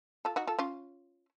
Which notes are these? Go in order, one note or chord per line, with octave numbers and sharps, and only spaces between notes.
F4 A4
D#4 F#4
F4 A4
C#4 F4